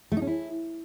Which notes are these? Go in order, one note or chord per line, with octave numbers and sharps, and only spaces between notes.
A3
D#4
C#4
E4